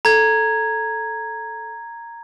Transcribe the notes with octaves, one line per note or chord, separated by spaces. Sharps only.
A4 A#5 G#6